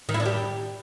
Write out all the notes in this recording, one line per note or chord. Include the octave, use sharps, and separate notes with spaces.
D#3
E4
D4
G4